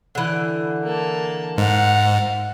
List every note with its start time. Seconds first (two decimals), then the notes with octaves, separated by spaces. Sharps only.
0.15 D3 E3
0.83 A#3 A5
1.58 G#2 F5 F#5